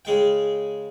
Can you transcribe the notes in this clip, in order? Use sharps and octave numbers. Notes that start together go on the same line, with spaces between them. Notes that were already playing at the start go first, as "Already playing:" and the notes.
C#3 G#3 G5